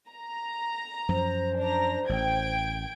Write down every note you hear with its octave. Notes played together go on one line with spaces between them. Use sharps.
A#5
F#2 F3 C5
D4 A#5
A1 G5 G#6 D7